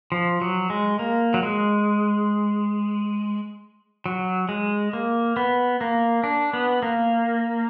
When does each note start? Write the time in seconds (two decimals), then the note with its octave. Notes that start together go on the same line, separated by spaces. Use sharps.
0.12 F3
0.42 F#3
0.70 G#3
0.99 A#3
1.34 F#3
1.43 G#3
4.06 F#3
4.49 G#3
4.93 A#3
5.37 B3
5.81 A#3
6.24 D4
6.53 B3
6.83 A#3